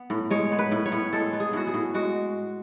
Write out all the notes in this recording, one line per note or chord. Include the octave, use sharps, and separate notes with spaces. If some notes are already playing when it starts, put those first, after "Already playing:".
Already playing: B3
A2
G#3 C#5
B3
B4
A2
C#5
A2
G#3 A4
B3
G#4
A2 F#4
G#4
A2
G#3 F#4